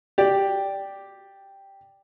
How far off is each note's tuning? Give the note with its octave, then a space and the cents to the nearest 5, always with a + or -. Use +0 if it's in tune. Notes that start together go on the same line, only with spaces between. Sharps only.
G4 +0 D5 +0